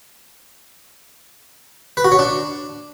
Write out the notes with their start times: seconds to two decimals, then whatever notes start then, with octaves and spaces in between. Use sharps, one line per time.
1.97 B4
2.04 F#4
2.12 C#5
2.19 D4